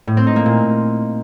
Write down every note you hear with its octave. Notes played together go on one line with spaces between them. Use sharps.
A2
C4
D#4
A#3
A#2